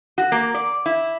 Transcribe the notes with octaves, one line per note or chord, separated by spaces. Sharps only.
F#4
A#3
D5
E4